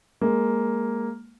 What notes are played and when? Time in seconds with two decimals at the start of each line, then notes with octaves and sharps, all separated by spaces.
0.21 G#3 A#3